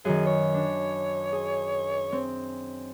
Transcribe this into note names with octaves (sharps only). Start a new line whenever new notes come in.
F#2 D#3 G#4
C#5
D4
G#4
C4